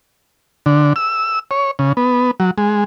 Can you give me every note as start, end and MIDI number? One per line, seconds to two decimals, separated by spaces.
0.66 0.93 50
0.96 1.39 88
1.51 1.71 73
1.79 1.93 49
1.97 2.31 59
2.40 2.51 54
2.58 2.84 56